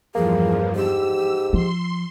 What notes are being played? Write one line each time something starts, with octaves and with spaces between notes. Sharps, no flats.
E2 G2 F3 A#3 G#4
G#2 G4 E6
F3 C6